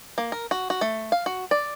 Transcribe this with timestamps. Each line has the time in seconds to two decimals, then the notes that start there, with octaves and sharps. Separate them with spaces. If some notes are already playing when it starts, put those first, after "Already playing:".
0.18 A#3
0.32 A#4
0.51 F#4
0.70 F#4
0.81 A3
1.12 F5
1.26 F#4
1.51 D5